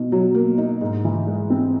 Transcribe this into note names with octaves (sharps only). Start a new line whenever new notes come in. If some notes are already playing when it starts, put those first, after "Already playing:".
Already playing: B2 D#4
F#3
A#3
D#4
G#2
E3
G#3
C4